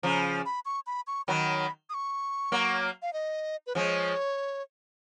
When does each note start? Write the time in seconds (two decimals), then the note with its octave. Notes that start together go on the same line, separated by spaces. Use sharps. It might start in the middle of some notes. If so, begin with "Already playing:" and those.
0.03 C#3 F3 A#5
0.46 B5
0.65 C#6
0.87 B5
1.07 C#6
1.28 D#3 F#3 B5
1.90 D#6
1.94 C#6
2.52 F#3 A#3
3.02 F5
3.13 D#5
3.67 B4
3.75 F3 G#3 C#5